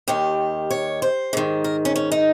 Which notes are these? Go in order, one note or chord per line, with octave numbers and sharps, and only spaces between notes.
D#2 D#3 G4
C#5
C5
G#2 D#3
A#4
C#4
C#4
D#4